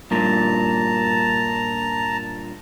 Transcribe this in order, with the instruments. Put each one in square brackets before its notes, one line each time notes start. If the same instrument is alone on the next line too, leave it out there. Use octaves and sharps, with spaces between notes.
[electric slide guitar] G2 A#2 [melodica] A5 A#5